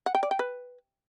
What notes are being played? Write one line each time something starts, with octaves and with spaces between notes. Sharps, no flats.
F#5
G5
D5
G5
B4